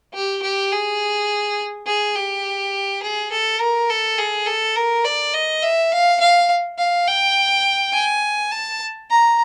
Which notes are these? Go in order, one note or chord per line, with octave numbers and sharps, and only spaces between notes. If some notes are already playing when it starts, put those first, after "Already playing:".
G4
G4
G#4
G#4
G4
G#4
A4
A#4
A4
G#4
A4
A#4
D5
D#5
E5
F5
F5
F5
G5
G#5
A5
A#5